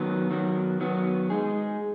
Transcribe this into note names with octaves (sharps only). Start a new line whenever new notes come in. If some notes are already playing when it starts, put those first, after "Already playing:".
Already playing: D#3 F#3 B3
D#3 F#3 B3
D#3 F#3 B3
G#3 D#4 G#4